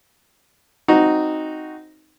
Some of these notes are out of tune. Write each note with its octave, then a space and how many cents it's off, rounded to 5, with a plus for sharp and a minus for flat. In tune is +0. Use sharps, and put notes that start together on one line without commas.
C4 +0 D#4 +0 F#4 +0